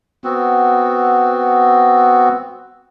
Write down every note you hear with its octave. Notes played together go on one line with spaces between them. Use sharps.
B3 C4 F#4